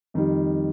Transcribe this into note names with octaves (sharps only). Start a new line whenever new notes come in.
F2 D#3 G3